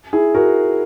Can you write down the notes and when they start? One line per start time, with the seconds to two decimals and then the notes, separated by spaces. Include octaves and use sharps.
0.13 E4 G#4
0.35 F#4 A#4